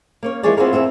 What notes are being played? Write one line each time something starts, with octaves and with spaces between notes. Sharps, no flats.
A#3 C#4 C#5
E3 F3 G#3 G#4 C#5 D5
B3 C4 E4 F4 G#4 A#4
E2 B3 C4 E5